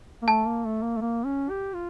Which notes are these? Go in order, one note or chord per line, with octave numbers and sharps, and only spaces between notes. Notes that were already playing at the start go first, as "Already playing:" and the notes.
A#3
A3 A5
A#3
A3
A#3
A3
A#3
C#4
G4
F4